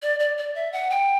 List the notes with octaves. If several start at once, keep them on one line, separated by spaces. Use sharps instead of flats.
D5
D5
D5
E5
F#5
G5